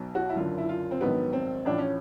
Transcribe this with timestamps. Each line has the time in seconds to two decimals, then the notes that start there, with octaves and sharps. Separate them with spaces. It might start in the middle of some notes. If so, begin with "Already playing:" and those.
Already playing: B1 B2 F#3
0.15 F#4
0.29 E4
0.36 F#1 F#2 D3 F4
0.58 E4
0.69 F4
0.91 C4
1.01 A#1 G#2 D#3 F#3 B3
1.33 C4
1.65 A1 A2 F3 D4
1.78 C#4